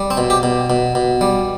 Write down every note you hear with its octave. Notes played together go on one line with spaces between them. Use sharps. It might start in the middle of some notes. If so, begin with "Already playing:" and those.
Already playing: G3
C4
B2
G4
B2
B2
B2
G3